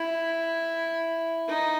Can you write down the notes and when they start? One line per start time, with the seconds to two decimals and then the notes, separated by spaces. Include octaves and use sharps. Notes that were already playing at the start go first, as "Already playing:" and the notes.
Already playing: E4
1.49 D#4